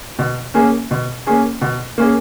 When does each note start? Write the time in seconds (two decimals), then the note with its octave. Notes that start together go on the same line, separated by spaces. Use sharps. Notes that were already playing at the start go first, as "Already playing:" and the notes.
0.19 B2
0.54 A#3 C#4 G#4
0.91 B2
1.27 A#3 C#4 G#4
1.61 B2
1.98 A#3 C#4 G#4